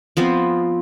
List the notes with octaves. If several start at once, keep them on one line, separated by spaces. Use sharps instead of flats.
F3 B3 C4